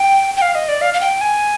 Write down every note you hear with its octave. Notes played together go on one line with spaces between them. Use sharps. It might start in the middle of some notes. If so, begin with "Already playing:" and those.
Already playing: G5
G5
F5
D#5
D5
F5
F5
G5
G#5